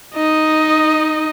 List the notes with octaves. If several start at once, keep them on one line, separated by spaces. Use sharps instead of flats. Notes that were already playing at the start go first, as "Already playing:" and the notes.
D#4 D#5